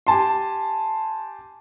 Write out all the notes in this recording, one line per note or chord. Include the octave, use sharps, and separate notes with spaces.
G4 G#5 A5 C6